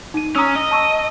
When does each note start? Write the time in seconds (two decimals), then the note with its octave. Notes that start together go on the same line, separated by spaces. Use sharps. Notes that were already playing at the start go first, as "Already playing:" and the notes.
0.14 D#4 D#7
0.36 C#4 A#5 D#6 E6
0.56 D#5
0.71 A5 C#6 E6